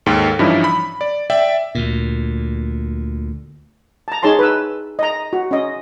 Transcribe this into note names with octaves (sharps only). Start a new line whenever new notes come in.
D#2 G#2 A4 G5
G2 E3 F3 C#4 D#4 E4
B5
D5
D5 E5 G5
D2 A#2
A5 A#5
D#4 G#4 C#5 A5 C6
B4 E6
D#5 A#5
F#4
C#4 D#5